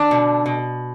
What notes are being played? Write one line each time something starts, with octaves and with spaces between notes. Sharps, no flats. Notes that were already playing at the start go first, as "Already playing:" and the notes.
Already playing: D3 D4
B2
B2